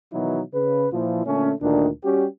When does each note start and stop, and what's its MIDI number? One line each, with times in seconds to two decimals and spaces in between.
0.13 0.42 47
0.13 0.42 51
0.13 0.42 52
0.13 0.42 54
0.13 0.42 63
0.13 0.42 64
0.53 0.86 49
0.53 0.86 71
0.92 1.22 46
0.92 1.22 52
0.92 1.22 53
1.26 1.52 46
1.26 1.52 50
1.26 1.52 57
1.26 1.52 61
1.61 1.88 38
1.61 1.88 46
1.61 1.88 51
1.61 1.88 62
2.04 2.26 55
2.04 2.26 61
2.04 2.26 66
2.04 2.26 67